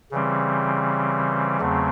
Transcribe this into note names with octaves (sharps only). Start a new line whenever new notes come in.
C#3 E3 G3 C4
E2 C#3 F#3 A3 C4